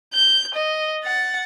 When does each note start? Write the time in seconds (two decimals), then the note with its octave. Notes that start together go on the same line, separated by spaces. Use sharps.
0.14 G6
0.55 D#5
1.04 F#5 A6